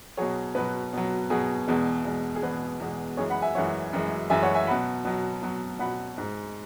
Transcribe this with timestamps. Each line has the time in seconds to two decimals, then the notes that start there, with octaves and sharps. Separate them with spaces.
0.17 B2 F#3 G#4 C#5
0.55 B2 F#3 B4
0.93 B2 F#3
1.30 B2 F#3 G#4
1.68 E2 B2 G#3
2.05 E2 B2 G#3
2.35 G#4
2.42 E2 B2 G#3 B4
2.80 E2 B2 G#3
3.17 F#2 E3 G#3 G#4 C#5
3.30 F#5 B5
3.42 E5 G#5
3.55 F#2 E3 G#3 C#5 F#5
3.93 F#2 E3 G#3
4.30 F#2 E3 G#3 E5 G#5
4.43 C#5 F#5
4.55 E5 G#5
4.67 B2 F#3 F#5 B5
5.05 B2 F#3
5.43 B2 F#3
5.79 B2 F#3 F#5 B5
6.18 G#2 G#3